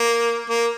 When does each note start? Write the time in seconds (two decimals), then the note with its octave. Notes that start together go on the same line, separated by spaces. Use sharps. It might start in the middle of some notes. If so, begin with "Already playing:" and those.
Already playing: A#3
0.49 A#3